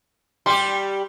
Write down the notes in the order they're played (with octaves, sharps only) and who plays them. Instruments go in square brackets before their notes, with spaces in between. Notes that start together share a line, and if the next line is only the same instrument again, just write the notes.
[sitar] G3 G4 [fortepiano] C6